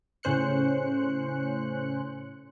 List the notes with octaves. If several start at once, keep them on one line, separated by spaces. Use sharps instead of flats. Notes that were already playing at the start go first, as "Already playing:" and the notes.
A2 C#3 C#4 C5 F#6 C#7